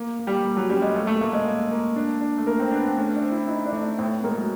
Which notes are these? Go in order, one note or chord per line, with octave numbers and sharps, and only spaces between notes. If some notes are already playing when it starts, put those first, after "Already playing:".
Already playing: A#3
A#3
G3
A#3
F#3
G3 C#4
G#3
A3 A#3
A3
A3 A#3
G#3
A#3
A#3
D4
D4
A3
A#3 A#4
C4
B3 D4
C4
A3 C#4
D4
C4
E4
D#4 E4
D4
A3 D#4
D4
A2 C4
B3
G#3 A#3
F#3